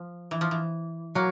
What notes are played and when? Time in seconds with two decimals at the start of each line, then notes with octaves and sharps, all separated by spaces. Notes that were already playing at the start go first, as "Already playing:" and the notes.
Already playing: F3
0.31 E3
0.41 F3
0.51 E3
1.15 F#3 A#3